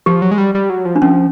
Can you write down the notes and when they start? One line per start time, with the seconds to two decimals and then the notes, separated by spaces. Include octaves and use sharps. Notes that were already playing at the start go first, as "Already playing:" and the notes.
0.06 F3 G4
0.22 F#3
0.31 G#3
0.38 G3
0.55 G3
0.70 F#3
0.85 F3
0.96 D4
1.02 F3 C#4